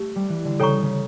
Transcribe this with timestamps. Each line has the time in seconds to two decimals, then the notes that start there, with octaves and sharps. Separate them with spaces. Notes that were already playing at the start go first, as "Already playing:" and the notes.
Already playing: A3 G4
0.16 G3
0.29 E3
0.45 D3
0.60 C#3 A4 C#5 G5 A#5 C#6
0.82 C#3